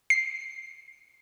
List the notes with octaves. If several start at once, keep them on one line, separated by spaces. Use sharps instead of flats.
C7